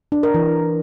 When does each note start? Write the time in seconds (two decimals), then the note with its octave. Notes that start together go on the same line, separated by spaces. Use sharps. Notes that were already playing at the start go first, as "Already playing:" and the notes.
0.12 D4
0.23 A#4
0.34 E3